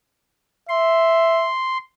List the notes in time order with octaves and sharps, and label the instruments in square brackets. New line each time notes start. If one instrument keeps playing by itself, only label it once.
[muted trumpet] E5 [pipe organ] C6